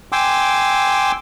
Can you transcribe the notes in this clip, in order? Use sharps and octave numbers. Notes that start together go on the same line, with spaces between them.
G5 G#5 C6 D6 E6